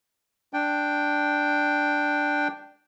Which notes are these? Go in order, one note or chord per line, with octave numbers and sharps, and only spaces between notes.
D4 G5